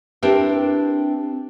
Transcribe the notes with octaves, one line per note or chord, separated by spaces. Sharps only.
C4 D4 E4 G4 A#4 B4